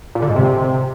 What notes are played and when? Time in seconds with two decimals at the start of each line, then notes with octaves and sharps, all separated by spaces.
0.15 A#2
0.22 D3
0.29 G#2
0.36 C3